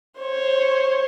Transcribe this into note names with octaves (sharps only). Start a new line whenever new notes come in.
C5 C#5